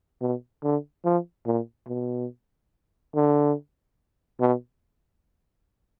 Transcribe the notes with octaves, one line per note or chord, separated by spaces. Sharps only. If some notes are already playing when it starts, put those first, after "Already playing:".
B2
D3
F3
A#2
B2
D3
B2